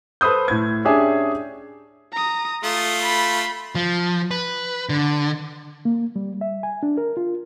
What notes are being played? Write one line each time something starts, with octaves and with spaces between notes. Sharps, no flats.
A4 B4 C5 D#6 G6
A2 G#6
C#4 D4 G4 G#4 E5 G#5
A#5 D#6
A3 F4 D#6
B5
F3
B4
D3
A#3
G3
E5
G#5
D4
A#4
F4